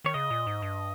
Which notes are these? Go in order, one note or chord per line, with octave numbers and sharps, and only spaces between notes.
D#3 C#5
C#3 D#5
A#2
G#2
G2